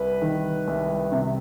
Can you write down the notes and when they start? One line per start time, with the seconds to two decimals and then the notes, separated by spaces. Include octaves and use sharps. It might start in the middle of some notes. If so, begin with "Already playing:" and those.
Already playing: C2 B4
0.22 D#3
0.68 C2
1.12 C3